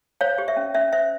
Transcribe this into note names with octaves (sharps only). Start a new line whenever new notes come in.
C5 C#5 F5
G4
E5
C#4
C#4 E5
C5 E5